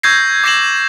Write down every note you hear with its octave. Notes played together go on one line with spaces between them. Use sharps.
C#6 E6 G6 G#6 A#6 C7
D6 G#6 A#6 C7 E7 F#7